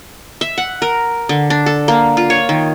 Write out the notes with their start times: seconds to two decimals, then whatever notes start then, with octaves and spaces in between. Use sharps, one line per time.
0.41 E5
0.58 F#5
0.82 A#4
1.29 D3
1.50 D4
1.66 A4
1.88 A#3
2.17 F4
2.30 C#5
2.49 D#3